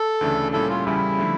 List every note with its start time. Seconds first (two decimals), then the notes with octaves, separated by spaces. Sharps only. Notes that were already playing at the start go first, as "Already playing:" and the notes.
Already playing: A4
0.21 D2 C#3 E3 A3 D4
0.53 A#2 G3 C#4 E4 A4
0.70 F4
0.86 E2 C#3 G3 E4
1.19 D3 F3 A3